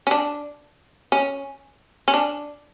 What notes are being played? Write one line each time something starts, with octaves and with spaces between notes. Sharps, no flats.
C#4
D4
C#4
C#4
D4